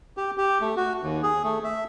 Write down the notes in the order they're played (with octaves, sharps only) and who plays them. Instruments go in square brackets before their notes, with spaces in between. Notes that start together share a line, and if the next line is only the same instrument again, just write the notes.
[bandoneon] G4
G4
A3
F#4
D#2
G#4
A3
E5